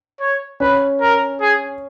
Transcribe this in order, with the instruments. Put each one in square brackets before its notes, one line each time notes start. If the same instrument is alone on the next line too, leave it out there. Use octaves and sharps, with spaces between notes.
[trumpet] C#5
[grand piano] C#4 [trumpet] B4
[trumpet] A#4
G#4